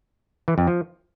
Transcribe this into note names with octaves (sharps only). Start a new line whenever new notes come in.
E3
F2
F3